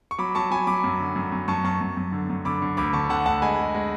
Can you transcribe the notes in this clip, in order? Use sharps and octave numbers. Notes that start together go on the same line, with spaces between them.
C#6
F#3 B5 D6
F#3 A5 C#6
F#3 G#5 B5
F#3 B5 D6
F#2
D3
F#2
F#2
F#2 A5 C#6
F#2 A5 C#6
F#2
F#2
D3
F#2
D3 B5 D6
D3
D2 B5 D6
D3 A5 C#6
D3 F#5 A5
D2 F#5 A5
G#3 G#5 B5
G#3
G#3